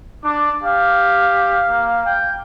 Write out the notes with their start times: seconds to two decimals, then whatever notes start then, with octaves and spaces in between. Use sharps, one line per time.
0.24 D4 D6
0.63 G4 F5
1.69 A#3
2.06 G5